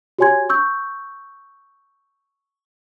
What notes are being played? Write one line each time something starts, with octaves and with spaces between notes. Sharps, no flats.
F#4 G4 C#5 G#5 C6 G#6
C#6 E6 G6